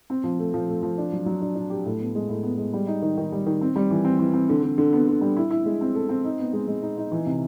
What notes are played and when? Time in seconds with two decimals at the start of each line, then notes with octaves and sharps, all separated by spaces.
0.10 C4
0.24 F3
0.39 A3
0.54 F3
0.68 A3
0.83 F3
0.98 D4
1.13 F#3
1.26 F#3
1.42 D4
1.55 D4
1.70 G4
1.85 A2
2.00 B3
2.15 G#3
2.29 A2
2.43 B3
2.58 G#3
2.73 G3
2.87 D#4
3.02 D#3
3.18 D#3
3.32 G3
3.46 D#3
3.61 C4
3.76 G3
3.90 E3
4.05 C4
4.19 E3
4.34 C4
4.49 D3
4.63 D3
4.78 D3
4.93 B3
5.08 D3
5.21 G3
5.37 E4
5.51 E4
5.66 G#3
5.81 C4
5.95 A4
6.09 C4
6.24 D#4
6.39 B3
6.53 G#3
6.68 G#3
6.82 D#4
6.98 D#4
7.12 E3
7.26 C3